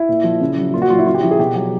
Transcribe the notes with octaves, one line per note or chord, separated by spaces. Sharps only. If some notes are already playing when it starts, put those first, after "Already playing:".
Already playing: E4
A#2
F3
C#3
F#3
A#2 F4
F#4
F#3 F4
E4
C#3 F4
G4
F3 E4
G#4
B2 G4
F#3 G4